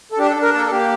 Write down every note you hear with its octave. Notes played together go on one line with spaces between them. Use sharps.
A4
D4 G4
A4
D4
A#4
A#3 A4
A4
A#3 G4